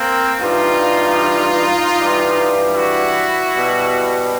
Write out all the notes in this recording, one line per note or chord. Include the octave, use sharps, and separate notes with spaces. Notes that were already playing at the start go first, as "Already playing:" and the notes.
Already playing: A#3 C4
G2 E3 G3 D#4 F4
G2 E3 G3
E4 F#4
B2 G3